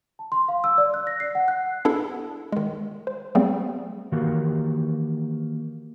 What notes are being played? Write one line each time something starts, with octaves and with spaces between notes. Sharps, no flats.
A5
C6
F5
E6
D5
F#6
A#6
C7
F#5
F#6
B3 D4 E4 G#4 A4
D#3 G#3
C5
F#3 G3 A3 B3 C4 G#4
D#3 E3 A#3 F#4 G4 A#4